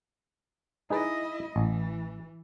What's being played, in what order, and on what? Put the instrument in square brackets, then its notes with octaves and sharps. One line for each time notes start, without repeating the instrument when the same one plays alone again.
[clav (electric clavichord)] D#4 G#4 B4 [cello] E4 D#5
[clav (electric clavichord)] A1 [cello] E3